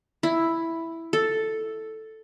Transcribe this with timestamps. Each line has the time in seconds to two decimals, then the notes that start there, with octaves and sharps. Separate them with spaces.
0.23 E4
1.13 A4